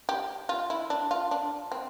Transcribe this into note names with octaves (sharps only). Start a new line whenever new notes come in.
G4
F4
E4
D4
F4
D4
C4